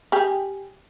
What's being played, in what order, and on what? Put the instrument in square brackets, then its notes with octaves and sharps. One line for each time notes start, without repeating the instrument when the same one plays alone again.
[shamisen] G4 G#4